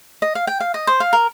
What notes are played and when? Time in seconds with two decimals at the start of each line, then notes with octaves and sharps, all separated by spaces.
0.22 D#5
0.35 F5
0.47 G5
0.60 F5
0.74 D#5
0.87 C5
1.00 F5
1.13 A#4